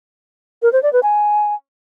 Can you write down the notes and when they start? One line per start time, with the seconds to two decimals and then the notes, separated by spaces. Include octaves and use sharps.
0.62 A#4
0.73 C5
0.83 D5
0.93 B4
1.03 G#5